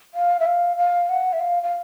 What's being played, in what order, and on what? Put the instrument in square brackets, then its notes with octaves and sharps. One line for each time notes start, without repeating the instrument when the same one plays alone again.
[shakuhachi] F5
E5
F5
F5
F#5
E5
F5
F5